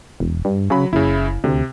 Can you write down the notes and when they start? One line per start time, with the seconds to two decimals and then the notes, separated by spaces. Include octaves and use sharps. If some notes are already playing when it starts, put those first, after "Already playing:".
0.20 E1
0.45 G2
0.70 C#3 F#3 B5
0.93 F#1 C#3 E4
1.44 D2 C3